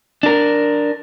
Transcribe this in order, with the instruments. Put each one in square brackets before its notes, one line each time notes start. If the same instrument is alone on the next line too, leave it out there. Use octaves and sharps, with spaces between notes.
[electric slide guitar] D4 A#4